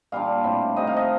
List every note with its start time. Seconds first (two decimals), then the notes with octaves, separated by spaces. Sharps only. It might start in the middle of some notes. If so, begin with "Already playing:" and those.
0.12 A#2 G3 D4 F4 F5
0.44 A2 G3 C4
0.76 C3 D#3 A3 D#5
0.87 F5
0.97 D#5